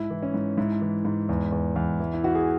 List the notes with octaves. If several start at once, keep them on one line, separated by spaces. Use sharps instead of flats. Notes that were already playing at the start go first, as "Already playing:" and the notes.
Already playing: G#2 E4
E3
C#4
G#2
G#2 E4
E3
G#2
E2
E2
E2
E3
E4
E3 F#4
G#4